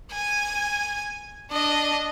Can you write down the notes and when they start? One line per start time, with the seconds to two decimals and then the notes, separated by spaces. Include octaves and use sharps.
0.11 G#5
1.51 D4 D#5